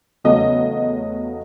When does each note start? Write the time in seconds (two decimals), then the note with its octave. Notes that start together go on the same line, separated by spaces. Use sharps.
0.24 E2 C#3 F#3 A3 D#5